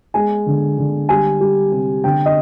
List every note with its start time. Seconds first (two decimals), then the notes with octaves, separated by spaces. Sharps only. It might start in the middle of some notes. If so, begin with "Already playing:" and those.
0.14 G#3 G#5
0.46 D3
0.78 D3
1.09 G3 G#5
1.40 G3
1.72 C3
2.04 D3 G5
2.26 D#5